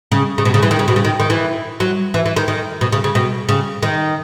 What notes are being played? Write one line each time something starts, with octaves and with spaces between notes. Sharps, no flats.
C#3
C#3
B2
C#3
E3
D#3
C#3
B2
C#3
D#3
D#3
E3
F#3
E3
E3
D#3
D#3
B2
C#3
C#3
B2
C#3
D#3